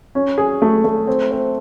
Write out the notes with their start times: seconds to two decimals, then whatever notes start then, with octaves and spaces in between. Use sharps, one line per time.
0.15 C#4
0.38 G#4
0.62 A3
0.84 A3
1.07 C4
1.31 C4